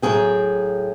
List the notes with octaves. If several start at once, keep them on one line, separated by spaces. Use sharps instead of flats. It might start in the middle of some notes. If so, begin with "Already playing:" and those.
A2 F#3 A#3 G#4 G5